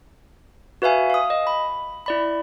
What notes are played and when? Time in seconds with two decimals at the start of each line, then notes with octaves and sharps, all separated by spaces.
0.82 F#4 B4 E5 F5 G#5
1.10 F5 D#6
1.30 D#5
1.47 B5
2.06 E4 D5 B5